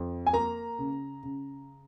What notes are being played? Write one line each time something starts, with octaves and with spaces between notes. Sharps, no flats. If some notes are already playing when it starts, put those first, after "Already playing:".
Already playing: F2
G#5
A#3 A#5
C#3
C#3